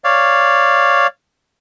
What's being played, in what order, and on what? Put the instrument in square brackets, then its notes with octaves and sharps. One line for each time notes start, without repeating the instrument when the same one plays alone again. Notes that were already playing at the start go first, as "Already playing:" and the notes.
[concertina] C#5 D5 F5